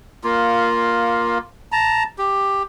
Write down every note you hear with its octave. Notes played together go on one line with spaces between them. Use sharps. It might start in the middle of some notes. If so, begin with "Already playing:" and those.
A#3 F4
A5 A#5
G4